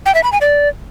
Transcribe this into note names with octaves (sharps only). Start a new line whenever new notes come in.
G5
E5
B5
G#5
D5